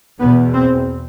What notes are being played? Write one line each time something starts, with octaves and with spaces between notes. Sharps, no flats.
E2 B2 B3
C4